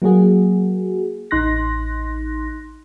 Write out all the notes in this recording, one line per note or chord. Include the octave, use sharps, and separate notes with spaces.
F#3 A#3 F#4 G#4
A1 D#4 C6 F#6 A#6